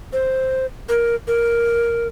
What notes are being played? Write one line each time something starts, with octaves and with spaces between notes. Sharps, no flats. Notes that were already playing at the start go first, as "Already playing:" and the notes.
C5
A#4
A#4